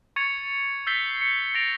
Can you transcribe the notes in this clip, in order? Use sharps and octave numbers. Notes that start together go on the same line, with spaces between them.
C#6 G#6 A6 C#7 F7
E6 G6 A6 B6 C7 G7
C#7
A6 A#6 C#7 D7 F7